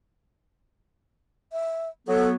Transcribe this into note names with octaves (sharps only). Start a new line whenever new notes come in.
E5
F#3 B3 A4